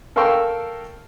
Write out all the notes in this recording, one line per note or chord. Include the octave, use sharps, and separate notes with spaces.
A4 A#4 F5 G5 C#6 E6